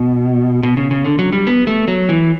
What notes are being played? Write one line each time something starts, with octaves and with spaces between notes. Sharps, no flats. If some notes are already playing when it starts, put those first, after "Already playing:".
Already playing: B2
B2
C#3
C#3
D3
F#3
G3
B3
A3
F#3
E3